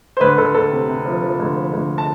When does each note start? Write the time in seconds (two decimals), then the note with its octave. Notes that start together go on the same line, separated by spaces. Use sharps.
0.17 C5
0.20 D2 B4
0.38 D2 A4
0.54 D2 A4
0.72 C3
0.88 C3
1.05 F3
1.22 F3
1.39 D2
1.56 F3
1.73 D2
1.98 A5